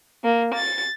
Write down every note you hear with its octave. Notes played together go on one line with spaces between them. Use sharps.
A#3
A6